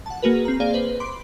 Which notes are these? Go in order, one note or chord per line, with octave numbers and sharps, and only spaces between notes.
F#5 A5
A#3 F#4 G#4 A#4 B4
C4 A#5
A#3 G#4 C5 D5 F5
B4 C5
B5 C6 D6 D7